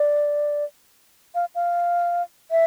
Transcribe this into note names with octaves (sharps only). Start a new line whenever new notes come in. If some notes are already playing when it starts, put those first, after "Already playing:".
Already playing: D5
F5
F5
E5